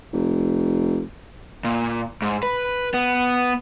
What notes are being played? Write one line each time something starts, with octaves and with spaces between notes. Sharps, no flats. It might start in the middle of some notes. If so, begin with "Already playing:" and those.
F1
A#2
G#2
B4
B3